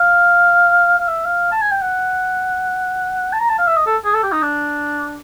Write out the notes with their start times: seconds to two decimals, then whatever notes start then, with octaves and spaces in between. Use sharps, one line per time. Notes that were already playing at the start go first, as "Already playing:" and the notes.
Already playing: F5
0.98 F5
1.07 E5
1.25 F5
1.52 A5
1.61 G#5
1.71 G5
1.81 F#5
3.33 A5
3.39 A#5
3.49 A5
3.58 F5
3.67 E5
3.77 D#5
3.86 A4
4.04 G#4
4.14 A4
4.23 G4
4.32 D#4
4.42 D4